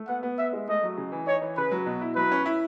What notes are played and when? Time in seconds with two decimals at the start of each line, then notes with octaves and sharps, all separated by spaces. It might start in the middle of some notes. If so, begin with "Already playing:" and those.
Already playing: A3
0.09 B3 F#5
0.23 B3
0.38 B4 E5
0.53 G#3
0.68 A3 D#5
0.83 F#3
0.97 C#3
1.12 E3
1.27 D#4 C#5
1.42 E3
1.57 C#3 B4
1.72 F#3
1.86 B2
2.01 E4
2.16 F#3 B4
2.32 C#4
2.46 E4